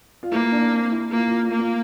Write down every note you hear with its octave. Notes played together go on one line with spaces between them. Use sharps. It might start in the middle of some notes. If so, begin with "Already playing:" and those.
F4
A#3 E4
D4
C4
E4
A#3 F4
F4
F4
A#3
F4